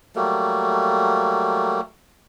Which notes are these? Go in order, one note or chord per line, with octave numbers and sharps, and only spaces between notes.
F#3 G3 A3 A#3